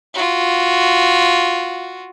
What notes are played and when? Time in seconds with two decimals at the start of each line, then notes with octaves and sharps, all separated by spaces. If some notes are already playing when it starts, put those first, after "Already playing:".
0.14 F4 F#4